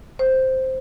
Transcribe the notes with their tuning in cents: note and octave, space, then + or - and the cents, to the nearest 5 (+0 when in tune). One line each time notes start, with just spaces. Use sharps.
C5 +0